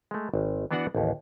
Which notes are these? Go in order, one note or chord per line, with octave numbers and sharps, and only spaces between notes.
G#3 A3
G#1
E3 B3 D4 F#4 D5 F#5
A1 D#2